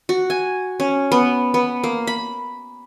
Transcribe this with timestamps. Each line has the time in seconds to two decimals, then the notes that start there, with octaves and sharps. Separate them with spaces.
0.09 F#4
0.30 G#5
0.80 C#4
1.12 B3
1.54 B3
1.84 A#3
2.07 B5